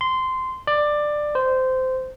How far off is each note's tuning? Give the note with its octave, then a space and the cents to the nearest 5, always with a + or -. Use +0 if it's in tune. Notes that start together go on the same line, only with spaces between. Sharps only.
C6 -15
D5 +15
C5 -15